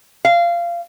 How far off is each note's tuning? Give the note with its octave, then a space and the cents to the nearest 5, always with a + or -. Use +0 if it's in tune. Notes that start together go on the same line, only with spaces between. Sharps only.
F5 -20